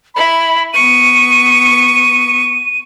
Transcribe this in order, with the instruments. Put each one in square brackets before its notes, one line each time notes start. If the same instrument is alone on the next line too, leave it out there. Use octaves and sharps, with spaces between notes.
[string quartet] E4 [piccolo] B5
[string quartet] B3 C#6 [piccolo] D#7